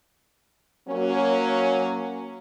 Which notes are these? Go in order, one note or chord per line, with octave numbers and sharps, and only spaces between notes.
F#3 A#3 C#4